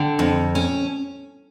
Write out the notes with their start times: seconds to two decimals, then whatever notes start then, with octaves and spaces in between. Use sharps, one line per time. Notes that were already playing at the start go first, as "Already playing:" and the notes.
Already playing: D3 G5
0.19 F2
0.55 C#4